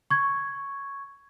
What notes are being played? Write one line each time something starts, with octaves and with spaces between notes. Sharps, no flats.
C#6 G#6